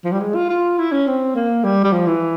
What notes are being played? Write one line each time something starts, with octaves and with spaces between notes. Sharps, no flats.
F3
G3
G#3
F4
F4
E4
C#4
C4
A#3
G3
G3
F3
E3